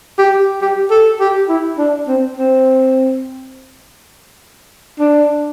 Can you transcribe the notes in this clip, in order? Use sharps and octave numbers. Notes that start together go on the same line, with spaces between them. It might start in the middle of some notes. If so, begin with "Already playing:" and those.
G4
G4
A4
G4
E4
D4
C4
C4
D4